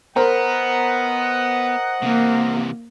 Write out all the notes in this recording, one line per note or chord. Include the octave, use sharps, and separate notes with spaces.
B3 A#4 C5 D#5 F#5 A#5
C3 E3 A#3